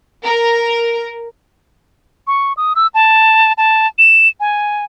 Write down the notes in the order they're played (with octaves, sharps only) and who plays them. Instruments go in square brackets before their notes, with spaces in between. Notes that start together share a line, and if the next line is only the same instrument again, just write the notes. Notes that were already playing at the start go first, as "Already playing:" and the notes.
[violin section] A#4
[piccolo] C#6
D#6
E6
A5
A5
E7
G#5